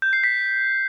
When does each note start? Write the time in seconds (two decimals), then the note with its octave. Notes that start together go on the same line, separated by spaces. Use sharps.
0.02 G6
0.13 C7
0.24 B6